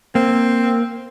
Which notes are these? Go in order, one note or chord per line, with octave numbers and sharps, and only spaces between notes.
A#3 C4